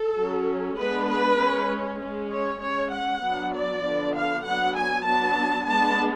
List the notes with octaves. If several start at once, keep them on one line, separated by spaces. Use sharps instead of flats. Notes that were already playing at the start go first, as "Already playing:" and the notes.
Already playing: A4
F#3 C#4
G#3 B3 D4 B4
B4
G#3 C#4
G#3 C#4
C#5
G#3 C#4 C#5
F#5
F#3 B3 D4
D5
D3 F3 B3 D4
F5
F#3 B3 D4 F#5
G#5
F#3 B3 D4 A5
G#3 B3 D4 A5